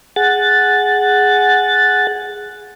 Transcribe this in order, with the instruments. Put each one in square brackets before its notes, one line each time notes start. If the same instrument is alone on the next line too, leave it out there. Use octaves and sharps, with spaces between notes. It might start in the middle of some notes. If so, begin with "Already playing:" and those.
[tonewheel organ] G#4 F#5 A6